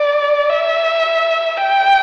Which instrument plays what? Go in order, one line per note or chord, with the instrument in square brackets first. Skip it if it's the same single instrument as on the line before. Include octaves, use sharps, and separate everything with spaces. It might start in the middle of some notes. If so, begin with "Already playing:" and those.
Already playing: [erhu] D5
E5
G5